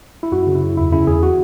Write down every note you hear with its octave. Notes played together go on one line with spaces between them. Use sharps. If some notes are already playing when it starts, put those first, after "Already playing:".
E4
F#2 F#4
C#3
E4
F#2
E2 E4
C#3 E4
E2 G#4
F#4